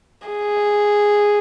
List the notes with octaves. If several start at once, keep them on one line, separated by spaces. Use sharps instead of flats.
G#4